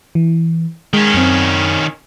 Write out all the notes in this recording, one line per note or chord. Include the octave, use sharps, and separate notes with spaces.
E3
D#3 G#3 C#4
F#2 C4